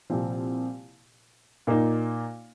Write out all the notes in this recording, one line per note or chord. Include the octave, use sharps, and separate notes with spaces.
C2 A#2 F3 C4
A#2 A#3 D#4